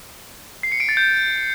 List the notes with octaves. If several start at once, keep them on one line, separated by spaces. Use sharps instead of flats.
C7
C#7
D7
A6
G6